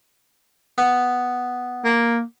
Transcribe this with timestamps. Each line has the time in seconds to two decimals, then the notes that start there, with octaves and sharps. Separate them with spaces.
0.78 B3
1.85 A#3